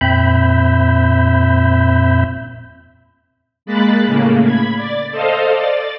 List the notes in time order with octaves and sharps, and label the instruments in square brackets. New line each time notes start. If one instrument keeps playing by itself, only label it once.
[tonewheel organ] F2 A#2 C4 E5 B5 G6
[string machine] G#3 A#3 B5 F#6 A6
A2 C#3 A#3
B5 G#6
D5 A6
A4 C5 D#5 F5
D5 A6